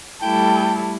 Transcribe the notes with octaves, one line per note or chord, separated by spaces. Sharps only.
G3 A3 E4 A4 G5